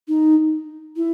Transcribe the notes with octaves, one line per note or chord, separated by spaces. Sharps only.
D#4
E4